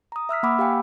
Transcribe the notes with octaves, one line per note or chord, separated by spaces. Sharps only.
A#5 D#6
E5 E6 F6 B6
A#3 F#5 B5 D6 E6
G4 F5 G5 G#5